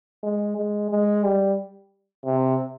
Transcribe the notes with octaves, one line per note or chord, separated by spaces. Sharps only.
G#3
G#3
G#3
G3
C3